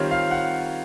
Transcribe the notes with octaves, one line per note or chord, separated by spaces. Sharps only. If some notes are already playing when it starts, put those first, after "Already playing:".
Already playing: D#3 G3 C4 F4 C#5
F5
F#5